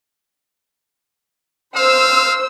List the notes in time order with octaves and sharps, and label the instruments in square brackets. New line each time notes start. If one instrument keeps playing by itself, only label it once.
[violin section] C5 E6 [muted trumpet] F5